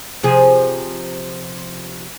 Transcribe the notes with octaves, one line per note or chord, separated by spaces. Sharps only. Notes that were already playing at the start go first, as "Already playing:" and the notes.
C3 F3 G#4